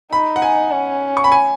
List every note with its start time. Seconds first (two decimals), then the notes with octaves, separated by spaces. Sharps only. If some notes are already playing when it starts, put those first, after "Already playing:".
0.12 D#4 B5
0.36 F#5
0.42 G#5
0.72 C#4
1.17 C#6
1.24 B5
1.32 G#5